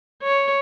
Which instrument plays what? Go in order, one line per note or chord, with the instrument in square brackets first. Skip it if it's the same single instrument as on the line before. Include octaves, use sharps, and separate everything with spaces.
[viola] C#5